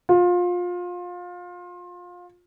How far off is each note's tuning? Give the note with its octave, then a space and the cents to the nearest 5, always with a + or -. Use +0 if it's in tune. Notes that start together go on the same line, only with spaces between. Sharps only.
F4 +25